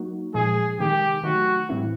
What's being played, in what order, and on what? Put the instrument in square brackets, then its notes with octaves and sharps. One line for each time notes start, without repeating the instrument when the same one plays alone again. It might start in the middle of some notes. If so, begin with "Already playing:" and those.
Already playing: [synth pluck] F#3 A#3 D#4 F#4
[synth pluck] A#2 F3 G#3 [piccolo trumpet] G#4
[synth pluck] C3 D#3 G#3 [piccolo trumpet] G4
[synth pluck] D#3 F#3 A3 [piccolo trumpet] F#4
[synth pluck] A2 E3 G3 C4 E4